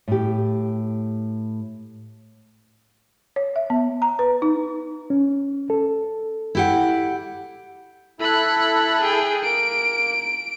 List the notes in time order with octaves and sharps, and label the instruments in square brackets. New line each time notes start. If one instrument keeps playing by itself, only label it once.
[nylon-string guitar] A2 G4
[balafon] C#5
E5
B3
A#5
B4
D#4
[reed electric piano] C#4
A4
[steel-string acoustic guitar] E4 G4 F#5
[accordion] E4 A4 [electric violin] B5 F#6
[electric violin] G#4 G5
[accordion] A#3 [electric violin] D7